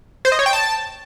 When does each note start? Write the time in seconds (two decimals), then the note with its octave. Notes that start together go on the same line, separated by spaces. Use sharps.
0.25 C5
0.32 D#5
0.39 C#5
0.46 G5
0.53 A5